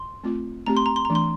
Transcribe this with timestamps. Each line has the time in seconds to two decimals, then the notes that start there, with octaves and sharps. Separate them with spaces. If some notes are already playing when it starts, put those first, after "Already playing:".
Already playing: C6
0.24 A3 C4 F4
0.66 A3 C4 G4 A#5
0.77 C6
0.86 A#5
0.96 C6
1.05 A#5
1.10 E3 A3 D4
1.15 C6